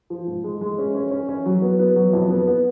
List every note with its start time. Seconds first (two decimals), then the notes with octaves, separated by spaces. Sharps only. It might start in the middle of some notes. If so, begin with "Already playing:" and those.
0.10 F3
0.27 G#2
0.44 G#3
0.61 G#3
0.78 C#4
0.95 C#4
1.11 C#4
1.29 C#4
1.46 F#3
1.62 B3
1.79 B3
1.96 F#3
2.13 F2
2.30 B3
2.47 B3